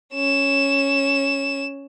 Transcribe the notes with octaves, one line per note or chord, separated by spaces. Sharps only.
C#4 E7